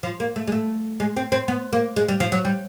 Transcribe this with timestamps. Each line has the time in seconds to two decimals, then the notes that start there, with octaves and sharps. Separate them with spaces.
0.03 F3
0.20 A#3
0.36 A3
0.48 G#3
0.52 A3
1.00 G#3
1.16 C4
1.32 C4
1.48 B3
1.73 A#3
1.96 G#3
2.08 G3
2.20 F3
2.32 F#3
2.45 G3